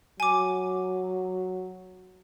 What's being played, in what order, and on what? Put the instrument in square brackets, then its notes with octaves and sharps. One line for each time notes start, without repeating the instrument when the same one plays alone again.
[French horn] F#3 [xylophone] G#5 D6